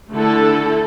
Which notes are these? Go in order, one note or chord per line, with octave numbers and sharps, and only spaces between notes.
D3 A3 E4 A4